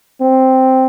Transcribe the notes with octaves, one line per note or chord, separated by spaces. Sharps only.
C4